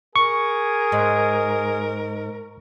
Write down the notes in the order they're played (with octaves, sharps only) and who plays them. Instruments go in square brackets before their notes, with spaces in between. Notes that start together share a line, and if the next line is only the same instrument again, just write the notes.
[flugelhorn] G#4 [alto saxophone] A#4 [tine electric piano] C#6
[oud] G#2